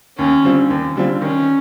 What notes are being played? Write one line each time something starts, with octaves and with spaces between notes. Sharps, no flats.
D#2 C#4
D3 G3 C4 F4
D#2
D3 G3 C4 F4
D#3 C#4